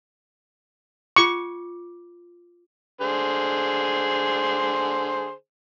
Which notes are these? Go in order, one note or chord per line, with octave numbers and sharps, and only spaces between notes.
F4 C#6 D6
D3 G#4 C5